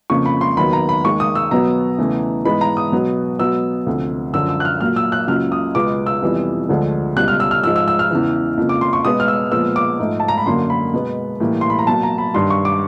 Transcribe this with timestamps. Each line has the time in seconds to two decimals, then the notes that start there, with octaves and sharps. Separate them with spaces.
0.10 F2 C#3 F3 A#3 C#6
0.26 B5
0.41 C6
0.57 D#2 D#3 F#3 B3 B5
0.73 A#5
0.89 B5
1.04 D#2 D#3 G#3 C#6
1.20 D#6
1.35 E6
1.51 B2 F#3 B3 A#5
1.98 E2 C#3 E3 A3
2.45 G#2 E3 G#3 B3 B5
2.61 A#5
2.77 D#6
2.92 B2 F#3 B3
3.39 B2 F#3 B3 E6
3.87 D2 C3 F3
4.33 F#2 D3 F3 E6
4.49 E6
4.60 F#6
4.65 F6
4.81 A#2 F#3 A#3 F6
4.96 E6
5.12 F#6
5.27 C#2 C#3 F#3 A#3 F6
5.52 D#6
5.75 C#2 B2 G#3 B3 D6
6.06 E6
6.22 F2 C3 E3 G3 B3
6.69 D2 D3 F3 G#3
7.16 C#2 B2 G3 F#6
7.28 F6
7.40 E6
7.51 F6
7.63 G#2 F3 G#3 E6
7.76 E6
7.88 E6
7.99 F6
8.11 E2 C#3 E3
8.57 F2 C#3 F3 A#3
8.69 D6
8.81 C6
8.93 C#6
9.05 B2 G#3 B3 D#6
9.20 F6
9.28 E6
9.52 A#2 F3 G#3 B3 E6
9.76 D6
9.99 G#2 F3 A3
10.20 A5
10.28 A#5
10.38 B5
10.46 F#2 D3 F#3 A#3 C6
10.70 B5
10.94 B2 G#3 B3
11.40 A2 E3 G3 A#3
11.61 C6
11.70 B5
11.79 A#5
11.87 B2 F#3 A#3 A5
12.03 A#5
12.18 B5
12.34 G2 D#3 G3 C6
12.50 C#6
12.65 D6